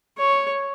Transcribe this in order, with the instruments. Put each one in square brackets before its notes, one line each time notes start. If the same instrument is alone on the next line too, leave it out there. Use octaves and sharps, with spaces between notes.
[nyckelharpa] C#5